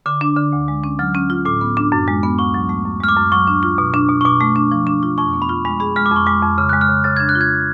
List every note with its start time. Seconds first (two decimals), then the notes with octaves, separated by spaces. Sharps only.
0.06 D3 D6
0.21 D4
0.36 D3
0.52 D2
0.68 G#3
0.84 C#4
0.99 F#3 F6
1.15 C#4
1.30 F4
1.45 A2 D6
1.61 B3
1.77 D4
1.92 F#2
2.08 G#3
2.23 B3
2.39 D2 C#6
2.54 F#3
2.69 A3
2.85 F#2
3.01 G#3 F6
3.08 D6
3.17 F#2
3.32 F#3 C#6
3.47 D4
3.63 F4
3.78 B2
3.94 D4
4.09 B2
4.21 C#6
4.25 B2 D6
4.41 A3
4.56 D4
4.72 F3
4.87 D4
5.03 F4
5.18 F2 C#6
5.33 B3
5.42 B5
5.49 F4
5.65 G#3 B5
5.80 G#4 B5
5.96 G#3 F6
6.06 D6
6.11 F2
6.16 C#6
6.26 G#3 D6
6.43 F2
6.58 C#3 F6
6.69 G#3 F#6
6.81 F6
6.89 C#3
7.04 C#3 A6
7.17 D4 G#6
7.29 F#6
7.35 F4
7.41 G#6